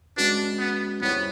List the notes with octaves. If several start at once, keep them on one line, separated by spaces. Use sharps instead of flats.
G#3 C#4 D4 F#4 B4
B3
G3 B3 C4 E4 G#4 C#5